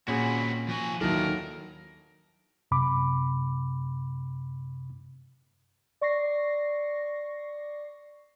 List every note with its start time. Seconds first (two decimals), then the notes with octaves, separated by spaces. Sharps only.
0.08 A#2 C4 C#4 F#4 G#4 B5
0.68 F3 F#4 G#5
1.01 D#2 D#3 F#3 D4 E4 F4 A4 A#4
2.71 F#2 C3 B5 D6
6.01 D5 C#6 A#6 C7